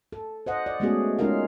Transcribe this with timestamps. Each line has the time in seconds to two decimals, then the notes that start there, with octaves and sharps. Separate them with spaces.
0.12 A4
0.46 C5 D#5 F#5
0.66 D5
0.80 G#3 A3 B3 C#4 F#4 G#4
1.19 G#3 C#4 D#4 F4 A#4 F5